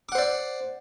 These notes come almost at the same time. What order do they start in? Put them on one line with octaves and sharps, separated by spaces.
D6 F#5 C5 D5